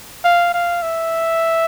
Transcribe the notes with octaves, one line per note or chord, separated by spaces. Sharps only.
F5
F5
E5